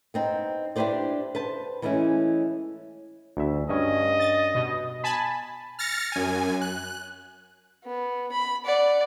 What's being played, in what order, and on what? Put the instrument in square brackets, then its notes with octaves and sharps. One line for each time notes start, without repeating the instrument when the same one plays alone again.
[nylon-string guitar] B3 C4 D#4
D4 E4 G4 B4 C5 D5
B4 C5 A5
E3 G#3 A3 C#4 E4
[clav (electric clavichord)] D2 E5
[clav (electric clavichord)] G2 C#4 G#5 [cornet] D#5
[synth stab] A6
B2
G#5 A5 B5
[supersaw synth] F6 A6 A#6 C#7
F#2 G#5
F#6
[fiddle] B3
B5
D5 F#5